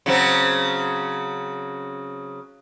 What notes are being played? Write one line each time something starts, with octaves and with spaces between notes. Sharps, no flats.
C#3 F#3 C4